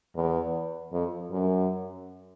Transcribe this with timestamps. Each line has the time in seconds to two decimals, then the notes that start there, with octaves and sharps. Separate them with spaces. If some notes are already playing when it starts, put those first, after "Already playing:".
0.16 E2
0.92 F2
1.31 F#2